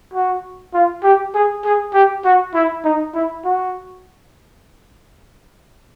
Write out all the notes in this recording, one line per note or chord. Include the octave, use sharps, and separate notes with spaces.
F#4
F4
G4
G#4
G#4
G4
F#4
E4
D#4
E4
F#4